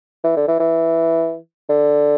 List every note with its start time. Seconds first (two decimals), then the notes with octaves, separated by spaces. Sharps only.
0.24 E3
0.36 D3
0.48 E3
0.60 E3
1.69 D3